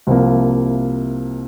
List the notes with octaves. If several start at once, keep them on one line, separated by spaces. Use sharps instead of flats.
C2 C3 F3 A#3